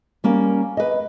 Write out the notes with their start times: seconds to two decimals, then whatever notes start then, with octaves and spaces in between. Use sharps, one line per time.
0.24 G3 A#3 C#4
0.77 B4 D#5